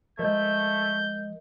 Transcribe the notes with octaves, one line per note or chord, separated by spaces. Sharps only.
F3 G#3 A3 A#4 D#5 G6